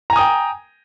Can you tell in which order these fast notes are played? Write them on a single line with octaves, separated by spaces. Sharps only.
A#5 G#5 D#6 G5